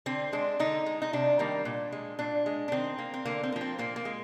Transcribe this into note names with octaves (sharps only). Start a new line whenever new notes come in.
D3 C4
G#3 D4
D3 D#4
G#3
D#4
C3 D4
D#3 G3 A#3
A#2
G#3
A#2 D4
G#3
D4
D#3 C4
A#3
C4
D3 A#3
C4
F3 A#3
C4
A#2 A#3
A#3
G#3